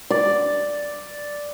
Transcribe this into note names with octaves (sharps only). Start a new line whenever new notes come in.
D5